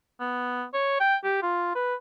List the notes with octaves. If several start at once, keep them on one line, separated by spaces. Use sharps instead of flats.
B3
C#5
G5
G4
F4
B4